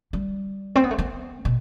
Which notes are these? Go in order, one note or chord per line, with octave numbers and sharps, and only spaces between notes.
G3
C4
B3
A3
B3
B2